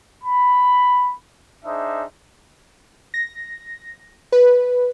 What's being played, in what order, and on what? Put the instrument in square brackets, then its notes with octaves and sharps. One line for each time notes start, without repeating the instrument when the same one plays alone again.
[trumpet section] B5
D4 D#4 G#4 C5 E5
[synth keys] A#6
B4